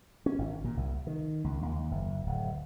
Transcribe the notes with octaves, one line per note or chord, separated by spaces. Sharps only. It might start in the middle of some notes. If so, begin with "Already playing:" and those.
C#4
G#1
A#2
C2
D#3
C#2
D#2
F#1
D1